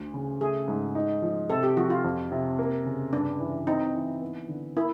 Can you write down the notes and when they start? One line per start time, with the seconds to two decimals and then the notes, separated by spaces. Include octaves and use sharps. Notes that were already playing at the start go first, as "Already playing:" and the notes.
Already playing: D2
0.14 C#3
0.41 A3 G#4
0.68 G#2
0.95 D#4
1.22 F3
1.50 C3 A4
1.63 G4
1.77 F3 F#4
1.90 F4
2.04 F2
2.32 C3
2.59 A#3
2.86 C#3
3.13 G2 D4
3.40 E3
3.67 C4 D#4
3.95 E3
4.21 B3
4.48 D3
4.76 A#3 E4